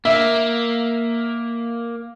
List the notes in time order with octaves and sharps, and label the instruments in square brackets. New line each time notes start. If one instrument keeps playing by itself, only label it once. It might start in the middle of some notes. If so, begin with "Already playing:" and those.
[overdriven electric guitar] A#3 [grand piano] E5